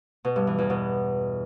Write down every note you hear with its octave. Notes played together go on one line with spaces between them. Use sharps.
B2
G2
E3
E2
B2